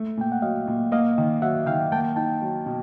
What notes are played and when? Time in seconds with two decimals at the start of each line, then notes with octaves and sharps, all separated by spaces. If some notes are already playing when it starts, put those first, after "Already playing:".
Already playing: A3
0.17 A#2 G5
0.32 F#5
0.42 F#3 D#5 F5
0.67 A#2
0.92 A#3 D#5 F5
1.18 D#3
1.42 F#3 E5 F#5
1.66 D#3 F5 G5
1.92 A#3 G5 A5
2.16 D#4 G5 A5
2.42 F#3
2.66 B2